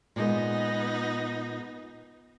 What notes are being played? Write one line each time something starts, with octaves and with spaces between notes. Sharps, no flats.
A#2 G#3 B3 D#4